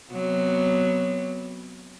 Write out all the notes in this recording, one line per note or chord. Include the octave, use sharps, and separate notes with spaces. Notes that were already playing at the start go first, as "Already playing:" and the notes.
C3 F#3 B3